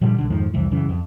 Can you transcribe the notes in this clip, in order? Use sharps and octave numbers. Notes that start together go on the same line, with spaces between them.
A#2 D3 F3 G3
B1 D3
F2 G#2 D#3 F3
C2 F2 E3
F#2 C#3 E3
F2